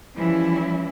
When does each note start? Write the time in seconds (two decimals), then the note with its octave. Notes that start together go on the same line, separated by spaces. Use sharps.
0.16 E3 F3 G3 C#4 E4